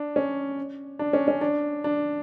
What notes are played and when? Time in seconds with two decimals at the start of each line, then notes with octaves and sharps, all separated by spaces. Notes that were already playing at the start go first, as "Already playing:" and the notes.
Already playing: D4
0.16 C#4
0.99 D4
1.13 C#4
1.28 C#4
1.41 D4
1.84 D4